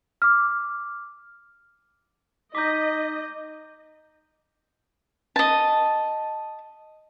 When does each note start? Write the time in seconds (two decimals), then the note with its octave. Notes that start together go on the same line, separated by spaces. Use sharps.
0.22 D6 F6
2.55 D#4 D#5 A#5 D6 G6 B6
5.36 D#5 A5